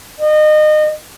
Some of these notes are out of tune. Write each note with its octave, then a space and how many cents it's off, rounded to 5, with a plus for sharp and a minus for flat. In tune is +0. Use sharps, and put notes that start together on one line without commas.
D#5 -30